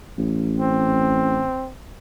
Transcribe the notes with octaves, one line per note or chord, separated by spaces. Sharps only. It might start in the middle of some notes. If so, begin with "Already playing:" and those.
A1
C4